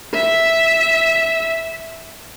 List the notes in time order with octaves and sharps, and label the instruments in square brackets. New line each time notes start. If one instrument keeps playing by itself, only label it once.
[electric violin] E5